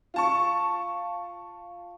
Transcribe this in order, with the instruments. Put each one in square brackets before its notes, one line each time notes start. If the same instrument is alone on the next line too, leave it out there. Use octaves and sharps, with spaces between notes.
[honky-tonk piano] F4 A5 C#6